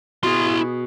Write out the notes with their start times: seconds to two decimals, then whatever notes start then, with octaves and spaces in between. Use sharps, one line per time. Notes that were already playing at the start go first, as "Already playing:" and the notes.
0.23 B2 E4 G#4 C6